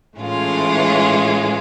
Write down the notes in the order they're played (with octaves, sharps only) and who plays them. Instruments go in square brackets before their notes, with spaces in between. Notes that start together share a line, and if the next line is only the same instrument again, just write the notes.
[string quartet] A2 E3 G#3 C#4 F4